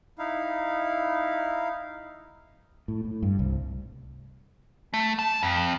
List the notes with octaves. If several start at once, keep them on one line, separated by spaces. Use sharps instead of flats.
D#4 E4 F5
A2
A2
G2
C2
A3
A5
F2